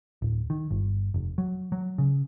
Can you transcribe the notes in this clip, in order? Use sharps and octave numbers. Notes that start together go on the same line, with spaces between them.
D1
D#3
G1
F1
F#3
F#3
C#3